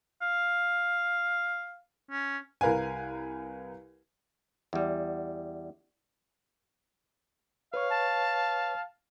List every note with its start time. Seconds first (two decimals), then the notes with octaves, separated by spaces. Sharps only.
0.22 F5
2.11 C#4
2.61 C2 A#4 B4 F5 G#5
4.73 E2 G3
7.74 B4 C#5 F5 C#6
7.90 A5